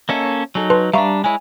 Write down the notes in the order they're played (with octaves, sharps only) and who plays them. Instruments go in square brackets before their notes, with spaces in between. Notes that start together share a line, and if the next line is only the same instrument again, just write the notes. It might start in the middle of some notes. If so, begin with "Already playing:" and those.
[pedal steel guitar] A#3 C#4 A4 [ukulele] D#5 E5
[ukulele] C#5
[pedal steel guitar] F#3 D#4 [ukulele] G#4 A4
[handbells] B4 A5 C6
[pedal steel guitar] G3 D4 [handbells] E5 F5 C#6 [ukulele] A#5
[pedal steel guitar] G#3 E4 [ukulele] C#5 G#5